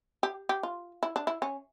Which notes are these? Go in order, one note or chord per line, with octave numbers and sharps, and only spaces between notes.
G4
G4
F4
E4
D4
E4
C#4